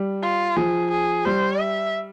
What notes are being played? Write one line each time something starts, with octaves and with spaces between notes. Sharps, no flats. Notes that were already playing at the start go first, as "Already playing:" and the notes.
Already playing: G3
F4
F3 G#4
G#4
G3 C5
E5